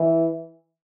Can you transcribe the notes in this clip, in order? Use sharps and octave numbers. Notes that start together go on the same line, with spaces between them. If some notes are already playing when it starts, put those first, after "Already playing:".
Already playing: E3